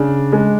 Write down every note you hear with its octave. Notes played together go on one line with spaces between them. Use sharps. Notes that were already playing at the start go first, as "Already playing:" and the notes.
Already playing: C#3 D4
G#3